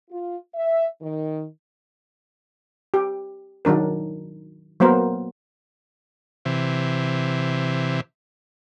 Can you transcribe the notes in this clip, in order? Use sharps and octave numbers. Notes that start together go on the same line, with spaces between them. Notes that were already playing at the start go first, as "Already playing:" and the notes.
F4
E5
D#3
G4
D#3 F#3 D4 A#4
F#3 A#3 B3 A#4 C5
C3 E3